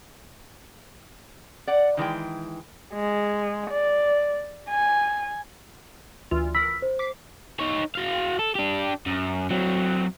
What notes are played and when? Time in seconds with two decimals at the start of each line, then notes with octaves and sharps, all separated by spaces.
1.67 D5 F#5
1.97 D#3 E3 G#3 G5
2.94 G#3
3.71 D5
4.69 G#5
6.31 D2 E3 F4
6.55 A#4 B5 E6 B6
6.82 C5
6.99 D6 B6 C7
7.59 D#4 C#5
7.95 F#4 F5
8.39 A4
8.55 D4 G4
9.06 F#2
9.51 F#3 C4